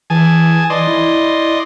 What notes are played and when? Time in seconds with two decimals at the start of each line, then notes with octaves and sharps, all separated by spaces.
0.10 E3 G#4 G#5 A5
0.70 E3 D5 D#5 C6
0.87 E4